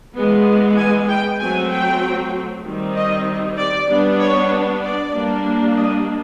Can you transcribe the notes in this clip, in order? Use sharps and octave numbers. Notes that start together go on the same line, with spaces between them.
E3 G#3 B3
G#5
G5
F#3 A3 C4 G#5
G5
D#3 G3 C4
D#5
D5
G3 B3 D4
C#5
D5
G3 A#3 D4
D#5